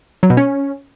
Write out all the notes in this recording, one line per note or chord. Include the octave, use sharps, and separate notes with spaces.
F#3
B2
C#4